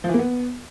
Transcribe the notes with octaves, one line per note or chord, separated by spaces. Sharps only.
F3
E3
A#3
B3